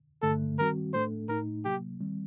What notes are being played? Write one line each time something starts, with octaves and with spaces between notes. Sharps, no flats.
G2 D3 A3 A4
D#3 G3 C4 F#4 A#4
A2 A3 D4 A4 C5
A2 A3 D#4 A#4
C3 F#3 A#3 G4
D#3 G3 C4